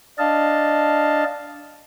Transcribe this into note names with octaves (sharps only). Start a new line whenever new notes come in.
D4 D#5 F5 A5